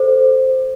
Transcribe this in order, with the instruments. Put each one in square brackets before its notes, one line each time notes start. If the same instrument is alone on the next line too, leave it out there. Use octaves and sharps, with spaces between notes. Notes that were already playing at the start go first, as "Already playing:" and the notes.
Already playing: [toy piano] A4 C5